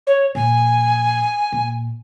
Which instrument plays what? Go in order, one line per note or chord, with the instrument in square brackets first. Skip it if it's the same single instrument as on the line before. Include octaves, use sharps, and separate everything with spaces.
[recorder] C#5
[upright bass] A#2 F3 [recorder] G#5
[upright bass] A#2